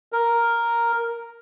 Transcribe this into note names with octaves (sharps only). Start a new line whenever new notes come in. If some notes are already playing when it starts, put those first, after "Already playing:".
A#4